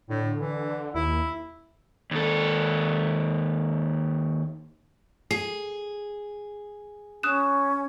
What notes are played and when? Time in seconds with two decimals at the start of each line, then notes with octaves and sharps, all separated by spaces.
0.09 A2 D3
0.40 E3
0.95 D#2 E4
2.11 D#2 A4
5.31 G#4 C7
7.23 C#4 D#6 F#6 E7